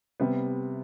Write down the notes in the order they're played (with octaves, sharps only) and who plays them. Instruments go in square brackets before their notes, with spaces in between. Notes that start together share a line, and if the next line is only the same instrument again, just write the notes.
[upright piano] C3 G3 B3